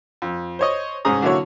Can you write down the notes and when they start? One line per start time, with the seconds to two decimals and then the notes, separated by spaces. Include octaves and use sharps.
0.22 F2
0.59 C5 C#5 D#5
1.05 C2 G#2 C#4 G#4 A#5 D#6
1.22 D3 F#3 A#3 E4 F#4 C#5